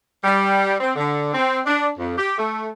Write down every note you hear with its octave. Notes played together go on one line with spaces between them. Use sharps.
G3
C4
D3
C4
D4
F2
G4
A3